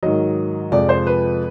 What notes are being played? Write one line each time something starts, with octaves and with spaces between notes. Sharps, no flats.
G#2 D#3 F#3 D#5
F2 C3 F3 G#3 D5
C5
B4